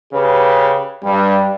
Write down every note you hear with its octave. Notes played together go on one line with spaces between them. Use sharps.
C#3 G4 B4
G2 G3